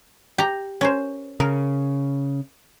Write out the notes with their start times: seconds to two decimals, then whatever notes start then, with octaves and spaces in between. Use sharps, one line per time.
0.38 G4 A#5
0.81 C#4 A#4 C5
1.40 C#3 A#4